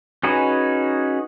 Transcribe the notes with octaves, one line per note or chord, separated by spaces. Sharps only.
C#4 D#4 F#4 G#4 B4